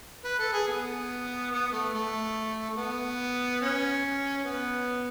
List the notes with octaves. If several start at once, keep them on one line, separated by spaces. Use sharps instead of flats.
B4
A4
G#4
B3
B3
A3
A3
A3
B3
C#4
B3